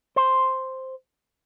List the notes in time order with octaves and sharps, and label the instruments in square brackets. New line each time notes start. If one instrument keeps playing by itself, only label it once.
[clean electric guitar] C5